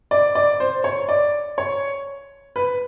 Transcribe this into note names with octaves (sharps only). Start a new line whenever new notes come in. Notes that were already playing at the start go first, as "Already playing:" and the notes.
D5
D5
C5
C#5
D5
C#5
B4